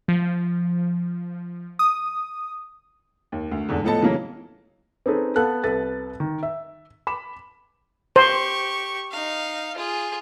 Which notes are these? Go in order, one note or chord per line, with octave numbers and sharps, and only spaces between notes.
F3
D#6
D#2
D2
E2 G#2 D3
A2 F3 B3 A4 D#5 A5
C#3 E3 F#3 A#3
C4 C#4 D#4 G#4 A4 B4
B3 A4 F5 A5 F#6
C2 A4 B4 A6
D#3
E5
B5 D6 E7
G4 C5 C#6
D#4 F5
F4 G#4